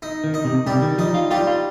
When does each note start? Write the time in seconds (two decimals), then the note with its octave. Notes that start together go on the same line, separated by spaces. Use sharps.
0.02 D#4
0.24 D#3
0.34 D#4
0.45 C3
0.66 C3 G3
0.82 D#3
0.98 F3 D#4
1.14 F4
1.31 G3 F4
1.47 F4